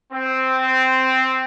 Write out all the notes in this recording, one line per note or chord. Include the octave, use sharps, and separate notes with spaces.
C4